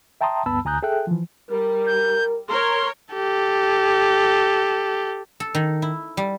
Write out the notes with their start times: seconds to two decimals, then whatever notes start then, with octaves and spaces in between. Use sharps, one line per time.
0.21 E5 G5 A5 A#5 C6 D#6
0.46 D2 G2 B3 A5 B5 E6
0.65 D2 G#5 A#5 D#6 F#6 G6
0.83 G#4 A4 E5 G5 F#6
1.07 E3 F3
1.51 G3 A#4
1.86 G6
2.48 A#4 C#5 C6
3.14 G4 A4
5.40 A4
5.55 D#3
5.82 E4
6.17 G3